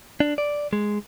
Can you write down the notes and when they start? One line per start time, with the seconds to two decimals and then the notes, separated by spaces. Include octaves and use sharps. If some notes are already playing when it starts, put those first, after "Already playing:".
0.20 D4
0.38 D5
0.73 G#3